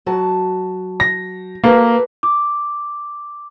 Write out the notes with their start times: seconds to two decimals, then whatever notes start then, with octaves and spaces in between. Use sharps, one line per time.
0.06 F#3 F#4 A5
1.00 A#6
1.64 A#3 F#4 A4 B4
2.23 D6